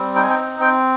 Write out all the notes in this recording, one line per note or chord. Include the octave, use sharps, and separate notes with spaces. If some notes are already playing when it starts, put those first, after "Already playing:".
Already playing: G3 C4
D#4 G5
G#5
G5
C4
C4 G5